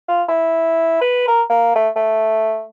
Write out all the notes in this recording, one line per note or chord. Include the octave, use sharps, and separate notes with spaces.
F4
E4
B4
A#4
A#3
A3
A3